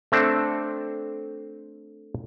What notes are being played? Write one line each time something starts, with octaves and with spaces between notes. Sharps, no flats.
A3 C4 D4 A4 C5